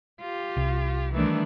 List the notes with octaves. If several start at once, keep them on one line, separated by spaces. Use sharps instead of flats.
F4 G4
C2
D#3 E3 G3 A3 D4